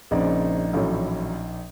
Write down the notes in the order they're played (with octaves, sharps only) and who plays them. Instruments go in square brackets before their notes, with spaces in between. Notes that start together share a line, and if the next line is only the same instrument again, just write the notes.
[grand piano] A#1 D#4 D5 [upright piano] C#3 C4
[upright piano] A1 A2 F#3